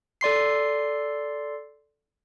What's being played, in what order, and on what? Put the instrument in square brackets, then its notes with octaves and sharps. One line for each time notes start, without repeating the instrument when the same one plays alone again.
[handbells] A4 D5 C6 C7